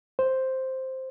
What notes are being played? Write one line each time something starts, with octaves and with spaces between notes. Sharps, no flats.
C5